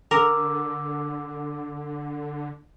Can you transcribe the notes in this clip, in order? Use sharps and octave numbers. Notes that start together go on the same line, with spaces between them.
D3 A#4 D6 E6